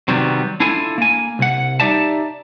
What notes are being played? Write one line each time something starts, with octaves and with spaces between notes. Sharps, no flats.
C3 D#3 F#3 G3 B3
D4 E4 F4 A4 G#5
A#3 G#5
C2 F#5
D#4 G4 D5 E5 A5